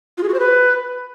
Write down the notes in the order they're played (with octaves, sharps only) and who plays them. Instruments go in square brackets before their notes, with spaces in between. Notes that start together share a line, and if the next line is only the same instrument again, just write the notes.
[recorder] F4
G#4
F#4
C5
B4